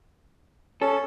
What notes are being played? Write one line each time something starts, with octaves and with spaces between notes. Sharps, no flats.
C#4 A4